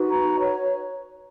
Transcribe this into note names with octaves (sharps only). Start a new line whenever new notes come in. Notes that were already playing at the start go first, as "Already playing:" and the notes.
Already playing: D#4 F#4 B4
A#5
C#5